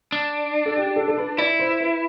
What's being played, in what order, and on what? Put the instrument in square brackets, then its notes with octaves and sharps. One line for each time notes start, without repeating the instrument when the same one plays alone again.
[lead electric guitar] D4
[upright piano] A4
G4
A4
A4
B4
[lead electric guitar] E4 [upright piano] D5
[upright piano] C5
B4